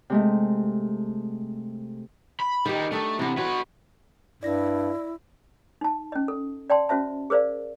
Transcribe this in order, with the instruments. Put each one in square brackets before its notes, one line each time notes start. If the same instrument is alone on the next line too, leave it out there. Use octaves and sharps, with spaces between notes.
[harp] C3 G#3 A3
[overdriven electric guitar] B5
[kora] D#3 G4 [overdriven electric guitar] G3 D#4
[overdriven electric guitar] A3 [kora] D4 D#4 A4
[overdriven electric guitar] C3 [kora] E3 B3
[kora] F#4 [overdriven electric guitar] B4 C#5
[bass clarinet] G2 [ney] E4 [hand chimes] D5 A#6
[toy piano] D#4 A5
C#4 D#5
A4
D5 G5 A5 C6
C#4 F#4 C5 E5 A5
G#4 A#4 C5 D5 F5